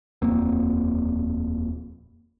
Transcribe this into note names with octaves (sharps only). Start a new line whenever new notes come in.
D#1 F2 A#3 C4